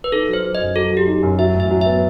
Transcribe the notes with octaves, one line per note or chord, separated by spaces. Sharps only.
B4
D#4 A4
F#3 C5
F#3
D#5
F#2
F#3 A4
F#3
G4
D#4
F#2
F#3 E5
A1
E5
F#3
B3 E5